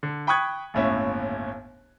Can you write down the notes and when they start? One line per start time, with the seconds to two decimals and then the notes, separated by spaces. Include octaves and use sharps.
0.03 D3
0.27 G5 B5 C#6 D#6 F#6 G#6
0.74 G1 D#2 A2 C#4 E5